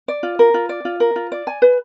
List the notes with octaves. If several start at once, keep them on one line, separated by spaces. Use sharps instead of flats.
D5
F4
A#4
F4
D5
F4
A#4
F4
D5
G#5
B4